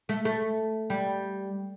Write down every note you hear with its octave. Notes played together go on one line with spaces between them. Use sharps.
A3
A3
G3